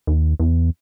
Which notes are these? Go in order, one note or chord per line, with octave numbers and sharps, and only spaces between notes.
D#2
E2